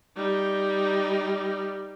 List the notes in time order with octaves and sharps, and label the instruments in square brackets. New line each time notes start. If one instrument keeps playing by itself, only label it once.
[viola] G3 D#4